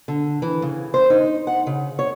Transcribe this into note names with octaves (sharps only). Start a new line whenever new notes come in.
D3
E3
C#3
C5
D#4
F#5
C#3
C#5